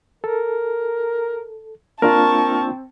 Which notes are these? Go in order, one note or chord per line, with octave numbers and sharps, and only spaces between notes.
A4 A#4
A#3 C4 D4 F4 A#4 A5 C#6